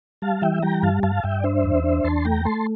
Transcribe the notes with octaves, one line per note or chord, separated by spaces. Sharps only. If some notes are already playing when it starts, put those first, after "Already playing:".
G3 F5 A5
E3 E5 G5
G3 G5 A#5
G2 F5 A5
G2 F5 A5
G2 E5 G5
D5
D4 C5 E5
E2
D4
E2 A5 C6
A3 G5 A#5
A3 A5 C6